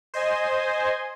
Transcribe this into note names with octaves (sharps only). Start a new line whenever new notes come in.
C5 D#5 G#5